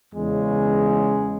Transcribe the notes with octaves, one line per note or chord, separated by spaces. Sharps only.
E2 C#3 G#3